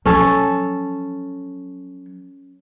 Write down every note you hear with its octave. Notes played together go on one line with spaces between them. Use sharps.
F3 F#3 C#4 A4